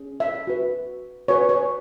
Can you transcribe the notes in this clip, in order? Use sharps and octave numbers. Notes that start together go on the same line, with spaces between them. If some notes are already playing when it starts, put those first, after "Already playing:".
Already playing: C#4 G#4
E5
F#4 B4
F#4 B4 C#5
C#5